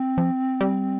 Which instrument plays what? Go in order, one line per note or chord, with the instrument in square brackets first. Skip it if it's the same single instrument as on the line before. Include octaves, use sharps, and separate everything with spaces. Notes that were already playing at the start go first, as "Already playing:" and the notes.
Already playing: [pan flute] C4
[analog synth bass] F3
G3